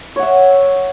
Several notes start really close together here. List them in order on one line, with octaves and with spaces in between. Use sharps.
C#5 F#5 E5